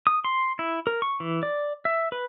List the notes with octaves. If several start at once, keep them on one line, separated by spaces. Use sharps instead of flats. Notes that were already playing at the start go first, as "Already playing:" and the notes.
D#6
C6
E4
A#4
C#6
E3
D5
E5
B4